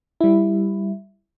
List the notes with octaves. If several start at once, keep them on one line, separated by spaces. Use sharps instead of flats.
G3 E4